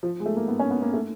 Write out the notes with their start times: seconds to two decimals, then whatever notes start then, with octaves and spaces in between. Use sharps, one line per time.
0.03 F3
0.20 G#3
0.26 A3
0.37 A#3
0.48 B3
0.59 C#4
0.71 B3
0.82 A#3
0.94 A3